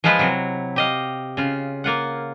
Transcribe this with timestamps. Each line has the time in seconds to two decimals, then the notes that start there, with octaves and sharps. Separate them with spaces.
0.04 F3 G#3 E4 F4 B4
0.19 C3 F#3
0.76 G4 D#5 F5
1.37 C#3 F4
1.84 A#3 F4 F#5